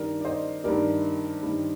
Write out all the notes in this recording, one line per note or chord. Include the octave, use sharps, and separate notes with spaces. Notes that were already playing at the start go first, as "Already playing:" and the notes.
Already playing: G2 D#3 G3 A#4 D5
D5
C5 D#5
G2 D#3 G3 A#4 D5
G2 D#3 G3